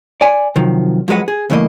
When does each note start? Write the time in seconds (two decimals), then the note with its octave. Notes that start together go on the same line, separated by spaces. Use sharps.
0.21 D5 G#5
0.56 C3 D#3 F3 F#3
1.08 F2 F#3 G#3 B4 F#5
1.28 G#4
1.50 C#2 G2 E3 A3 A#3 D#5